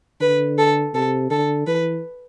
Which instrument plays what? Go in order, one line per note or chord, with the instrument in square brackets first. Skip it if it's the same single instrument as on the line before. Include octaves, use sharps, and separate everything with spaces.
[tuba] D3 [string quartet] B4
[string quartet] A4
[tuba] C3 [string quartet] A4
[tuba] D3 [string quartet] A4
[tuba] E3 [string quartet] B4